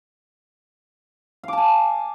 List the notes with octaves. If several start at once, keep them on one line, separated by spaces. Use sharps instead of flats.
F5 G#5 A5 D6